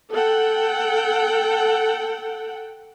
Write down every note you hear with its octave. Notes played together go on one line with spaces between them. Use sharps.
A4 F#5 G5